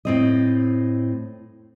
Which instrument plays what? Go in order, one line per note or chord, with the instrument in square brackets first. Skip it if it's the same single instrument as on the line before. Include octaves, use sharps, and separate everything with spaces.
[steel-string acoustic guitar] A2 C4 D#5